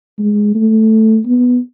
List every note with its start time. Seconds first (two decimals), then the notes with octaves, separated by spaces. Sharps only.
0.19 G#3
0.55 A3
1.26 B3